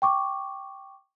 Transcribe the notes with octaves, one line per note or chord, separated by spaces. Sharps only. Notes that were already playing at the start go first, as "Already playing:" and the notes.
G5 C#6 D6